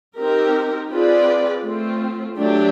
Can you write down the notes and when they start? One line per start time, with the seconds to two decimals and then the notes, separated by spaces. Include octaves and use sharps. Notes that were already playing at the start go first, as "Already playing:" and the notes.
0.15 C4 D#4 G4 A#4
0.89 C4 F4 G#4 B4 D5
1.63 A3 C4 F4
2.36 F#3 A3 D4 G4